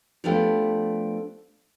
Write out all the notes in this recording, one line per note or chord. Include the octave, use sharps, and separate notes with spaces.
F3 A3 B3 D4 G4